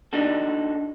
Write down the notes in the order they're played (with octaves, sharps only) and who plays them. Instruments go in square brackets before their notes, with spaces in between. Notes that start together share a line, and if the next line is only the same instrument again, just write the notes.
[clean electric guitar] D4 D#4 F#4 A4